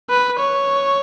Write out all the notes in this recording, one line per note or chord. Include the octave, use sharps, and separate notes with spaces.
B4
C#5